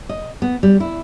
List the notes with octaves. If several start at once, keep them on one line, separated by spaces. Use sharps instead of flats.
D#5
B3
G3
E4